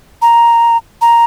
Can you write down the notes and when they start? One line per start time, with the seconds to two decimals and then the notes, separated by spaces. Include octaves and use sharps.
0.22 A#5
1.01 A#5